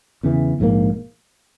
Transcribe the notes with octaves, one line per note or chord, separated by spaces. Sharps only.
E2 C#3 E3
A#1 G#2 E3 A#3